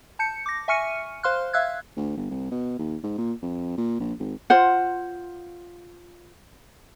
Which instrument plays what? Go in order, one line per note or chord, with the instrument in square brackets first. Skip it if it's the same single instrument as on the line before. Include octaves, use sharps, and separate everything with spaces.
[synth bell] A5 G6 C#7
D6 A#6
E5 G#5 C#6 F6 C#7 D#7
C5 F5 C6 F6 F#6
E5 F5 E6 F#6 G#6
[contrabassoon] D2
G1
C2
B2
D#2
G#2
A#2
F2
A#2
A#1
G#1
[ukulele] F4 C5 F#5